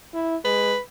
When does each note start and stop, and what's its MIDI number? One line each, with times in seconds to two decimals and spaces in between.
0.14 0.36 64
0.45 0.74 56
0.45 0.79 71